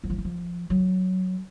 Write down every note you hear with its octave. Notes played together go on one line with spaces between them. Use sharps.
F#3
F3
E3
F3
F#3